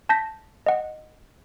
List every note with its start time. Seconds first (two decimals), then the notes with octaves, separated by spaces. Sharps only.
0.09 A5 G6 A#6 B6
0.66 D#5 F#5